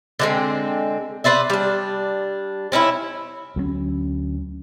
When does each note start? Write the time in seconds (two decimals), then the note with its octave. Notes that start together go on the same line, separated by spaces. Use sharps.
0.19 D3 G#3 C4
1.24 B4 C5 D5 E5
1.50 G3 D4
2.72 C4 C#4 D#4 E4
3.56 D2 F#3 G#3 C#4